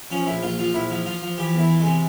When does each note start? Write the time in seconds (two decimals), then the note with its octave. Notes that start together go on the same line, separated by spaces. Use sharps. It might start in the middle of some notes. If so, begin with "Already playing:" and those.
0.11 F3 C#4
0.27 A#1 E4
0.42 A#1 F4
0.58 F3 F4
0.74 A#1 E4
0.90 F3
1.06 F3 F4
1.22 F3
1.38 E3 G4
1.54 E2
1.59 E4
1.69 E3
1.80 C3 G#3